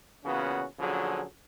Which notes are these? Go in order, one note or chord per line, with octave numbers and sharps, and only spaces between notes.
A#2 C#3 E3 B3 C#4 F#4
A#1 D3 F3 F#3 C#4 G#4